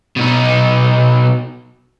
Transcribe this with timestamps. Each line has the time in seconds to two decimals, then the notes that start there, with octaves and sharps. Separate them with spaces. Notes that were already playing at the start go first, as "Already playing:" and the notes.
0.16 B2 D#4